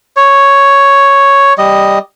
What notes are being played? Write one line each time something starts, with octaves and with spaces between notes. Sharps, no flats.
C#5
G3 D#5